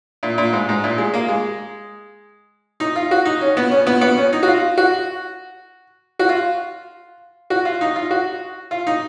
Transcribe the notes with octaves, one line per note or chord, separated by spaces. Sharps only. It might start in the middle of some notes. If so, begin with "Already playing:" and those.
A#2
A#2
G#2
G#2
A#2
G#3
A#3
G#3
D#4
F4
F#4
D#4
C#4
B3
C#4
B3
B3
C#4
D#4
F#4
F4
F#4
F#4
F4
F#4
F4
D#4
F4
F#4
F4
D#4